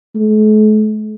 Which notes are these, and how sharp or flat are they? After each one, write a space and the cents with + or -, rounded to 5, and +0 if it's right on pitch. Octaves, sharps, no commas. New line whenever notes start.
A3 -45